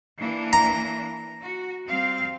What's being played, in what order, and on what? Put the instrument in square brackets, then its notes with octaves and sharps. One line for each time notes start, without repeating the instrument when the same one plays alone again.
[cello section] E3 A#3 D4
[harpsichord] A#5
[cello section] F#4
G3 C4 F5